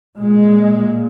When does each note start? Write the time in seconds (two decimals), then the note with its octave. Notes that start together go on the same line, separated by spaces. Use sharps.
0.18 A#2 G#3